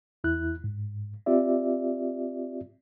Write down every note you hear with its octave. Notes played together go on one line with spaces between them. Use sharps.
E2 E4 F#6
G#2
C4 F4 G4 D5 E5